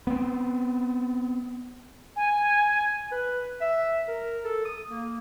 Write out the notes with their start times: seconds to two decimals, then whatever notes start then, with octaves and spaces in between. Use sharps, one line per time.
0.07 B3 C4
2.16 G#5
3.12 B4
3.61 E5
4.08 A#4
4.44 A4
4.65 D#6
4.89 A#3